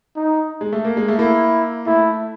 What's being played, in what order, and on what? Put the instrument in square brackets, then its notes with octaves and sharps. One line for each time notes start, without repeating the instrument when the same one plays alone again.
[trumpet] D#4
[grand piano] G#3
A3
A#3
G#3
A3
[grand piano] A#3 [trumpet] E4
[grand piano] A3 [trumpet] E4